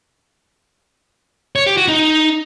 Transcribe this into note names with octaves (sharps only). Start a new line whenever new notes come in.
C#5
G4
F#4
D#4